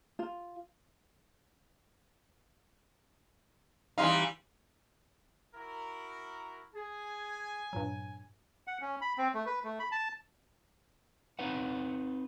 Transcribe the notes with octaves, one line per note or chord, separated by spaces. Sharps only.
F4
E3 G3 D#4 F5 C6
E4 F#4 A#4
G#4 G#5
G2 A#2 F#3
F#5
C#4
B5
C4
A3
B4
A3
B5
A5
C4 D#4 B4 F#5